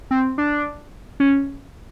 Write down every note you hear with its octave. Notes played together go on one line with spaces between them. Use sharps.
C4
D4
C#4